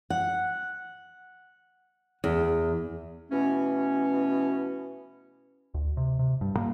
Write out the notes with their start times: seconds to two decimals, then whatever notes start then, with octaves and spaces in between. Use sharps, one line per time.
0.10 F#5
2.24 E2
3.31 B2 E3 A3 C#4
5.74 D2
5.97 C3
6.19 C3
6.41 G2
6.57 A#3